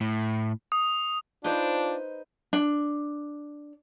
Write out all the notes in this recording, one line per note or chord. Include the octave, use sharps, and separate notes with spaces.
A2
D#6
D4 D#4 F4 B4 C5
D4